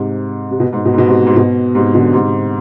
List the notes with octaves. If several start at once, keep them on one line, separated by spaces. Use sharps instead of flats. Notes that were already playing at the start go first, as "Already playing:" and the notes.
Already playing: G#2 C3
C3
B2
G#2
B2
G#2
B2
G#2 C3
G#2
B2
G#2 C3
B2 D3
G#2 C3